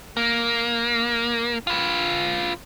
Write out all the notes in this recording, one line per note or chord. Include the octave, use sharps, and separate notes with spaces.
A#3
F4 B4